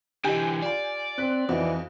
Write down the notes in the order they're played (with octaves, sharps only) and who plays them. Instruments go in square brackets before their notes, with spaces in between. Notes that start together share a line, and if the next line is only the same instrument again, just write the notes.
[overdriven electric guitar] D3 E3 [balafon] G4 D#5 [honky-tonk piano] G5 G#5 G6
[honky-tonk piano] F4 G#5 [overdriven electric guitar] D5
[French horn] C4 [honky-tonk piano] F#6 B6
[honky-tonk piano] F2 D#4 [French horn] E3 [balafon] F#4 C5 F#5